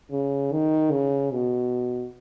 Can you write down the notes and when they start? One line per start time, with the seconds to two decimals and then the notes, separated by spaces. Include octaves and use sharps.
0.11 C#3
0.52 D#3
0.91 C#3
1.31 B2